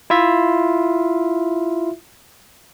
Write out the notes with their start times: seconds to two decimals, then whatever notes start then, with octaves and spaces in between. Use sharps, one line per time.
0.10 E4 F4 E5